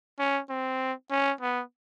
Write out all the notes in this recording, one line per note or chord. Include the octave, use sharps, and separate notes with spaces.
C#4
C4
C#4
B3